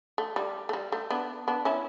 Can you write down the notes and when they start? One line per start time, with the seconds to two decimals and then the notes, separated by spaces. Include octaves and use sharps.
0.18 A3
0.36 G3
0.69 A3
0.73 G3
0.92 A3
1.10 B3 D4
1.48 B3 D4
1.65 C#4 E4